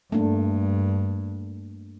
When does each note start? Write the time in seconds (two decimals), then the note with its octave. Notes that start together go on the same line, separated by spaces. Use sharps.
0.12 G2 A3 A#3 D4